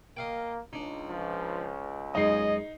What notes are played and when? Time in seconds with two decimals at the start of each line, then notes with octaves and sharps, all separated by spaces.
0.17 A#3 D#5 F5 G5
0.73 C#2 D4 D#4
1.09 F3
2.15 F#2 G#3 D#4 D#5 C7